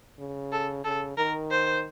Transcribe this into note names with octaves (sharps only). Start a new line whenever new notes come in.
C#3
A4
C#3 A4
D#3 A#4
C5